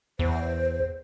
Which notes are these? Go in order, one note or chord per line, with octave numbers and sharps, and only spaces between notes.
E2 C5